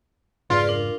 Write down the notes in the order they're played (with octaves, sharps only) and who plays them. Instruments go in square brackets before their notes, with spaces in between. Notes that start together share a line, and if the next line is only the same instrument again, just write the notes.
[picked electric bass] F1 G#2 C#3 [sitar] F4 [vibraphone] G#4 B4 D5
[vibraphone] D4 A#4